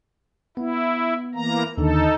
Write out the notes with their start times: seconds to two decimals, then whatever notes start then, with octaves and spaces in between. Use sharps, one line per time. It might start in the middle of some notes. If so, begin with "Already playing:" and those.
0.57 B3 E4
1.35 E3 A#3 A#5
1.78 D#2 D3 D#3 D#4 A4